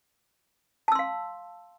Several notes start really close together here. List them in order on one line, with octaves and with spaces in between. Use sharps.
A5 E6 C6 F5